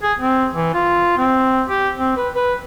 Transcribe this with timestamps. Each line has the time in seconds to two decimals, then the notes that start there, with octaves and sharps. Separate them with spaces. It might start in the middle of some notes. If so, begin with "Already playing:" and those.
0.03 G#4
0.18 C4
0.54 E3
0.74 F4
1.18 C4
1.69 G4
1.97 C4
2.17 B4
2.35 B4